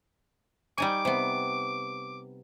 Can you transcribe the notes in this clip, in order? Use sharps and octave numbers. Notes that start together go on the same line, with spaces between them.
G3 D#4 G#5 D6
C3 B3